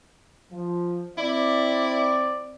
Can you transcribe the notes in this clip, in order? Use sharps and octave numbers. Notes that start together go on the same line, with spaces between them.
F3
C4 E4 D5